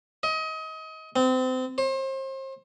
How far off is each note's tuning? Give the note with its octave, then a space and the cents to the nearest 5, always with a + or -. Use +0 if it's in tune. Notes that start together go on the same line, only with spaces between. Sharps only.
D#5 +30
C4 -30
C5 +35